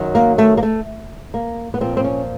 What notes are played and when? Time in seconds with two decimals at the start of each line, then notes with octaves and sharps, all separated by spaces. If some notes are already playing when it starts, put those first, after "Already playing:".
Already playing: F#2 D#3 F#3
0.15 A#3
0.38 A3
0.57 A#3
0.63 A3
1.34 A#3
1.74 B3
1.81 A#2 F3 C4
1.97 C4
2.04 C#4